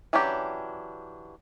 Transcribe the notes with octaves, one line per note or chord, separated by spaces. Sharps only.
E3 F#3 C#4 D4 G4